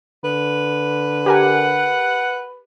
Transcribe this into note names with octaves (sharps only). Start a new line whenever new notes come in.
D3 B4
G4 A#4 F#5 G#5